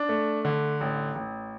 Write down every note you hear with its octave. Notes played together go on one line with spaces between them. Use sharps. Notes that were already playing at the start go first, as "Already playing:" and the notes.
Already playing: D4
A3
D3
A1
A1